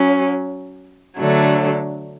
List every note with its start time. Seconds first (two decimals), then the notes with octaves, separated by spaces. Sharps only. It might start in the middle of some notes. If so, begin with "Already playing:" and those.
Already playing: F#3 C#4
1.18 D3 F#3 A3 D4